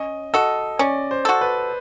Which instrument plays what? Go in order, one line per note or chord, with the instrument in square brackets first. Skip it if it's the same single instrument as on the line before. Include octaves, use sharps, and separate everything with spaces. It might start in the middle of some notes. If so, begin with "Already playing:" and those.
Already playing: [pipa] C#4 [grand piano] D#5
[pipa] F#4 A4 [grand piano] D#5
[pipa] C#4 [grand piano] D5
[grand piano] C5
[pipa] F#4 A4
[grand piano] B4